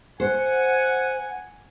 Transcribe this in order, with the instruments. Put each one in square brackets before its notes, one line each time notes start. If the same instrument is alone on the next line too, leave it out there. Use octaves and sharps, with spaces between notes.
[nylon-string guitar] C5 [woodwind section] F#5 [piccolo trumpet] G#5